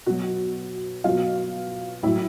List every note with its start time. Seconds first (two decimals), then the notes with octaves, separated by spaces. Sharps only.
0.06 B2 F#3 F#4
1.04 B2 F#3 F4
2.03 A2 F#3 E4